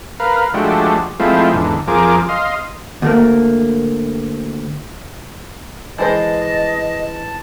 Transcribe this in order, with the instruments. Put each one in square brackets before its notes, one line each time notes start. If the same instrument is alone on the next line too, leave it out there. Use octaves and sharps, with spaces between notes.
[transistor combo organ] A#4 B4 F5
F3 G#3 A3 D4 F#4 G4
F3 G#3 A3 C4 E4 F4
E2 G#2 D3
F2 F3 G#4 A#4 D6
D#5 F5 C6
[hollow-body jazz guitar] D2 A3 A#3
[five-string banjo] E3 G#3 C5 [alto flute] D#5 [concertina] A5